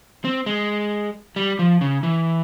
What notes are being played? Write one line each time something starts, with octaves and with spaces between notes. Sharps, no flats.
C4
G#3
G3
F3
C#3
E3